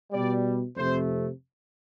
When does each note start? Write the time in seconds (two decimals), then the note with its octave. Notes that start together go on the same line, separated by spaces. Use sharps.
0.12 B2 G3 D5
0.77 F2 C3 A3 C5